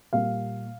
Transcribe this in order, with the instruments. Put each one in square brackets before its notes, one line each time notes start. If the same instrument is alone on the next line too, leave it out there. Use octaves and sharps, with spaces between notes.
[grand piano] A#2 G3 A#3 F5